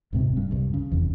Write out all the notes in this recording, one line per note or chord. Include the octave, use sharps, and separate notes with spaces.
D#1 G#2 C3
G2
C2 G2
C#3
F1 E2